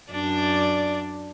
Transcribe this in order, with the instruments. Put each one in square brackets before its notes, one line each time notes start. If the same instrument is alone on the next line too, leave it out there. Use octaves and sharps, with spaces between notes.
[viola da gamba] F#2 D4 D5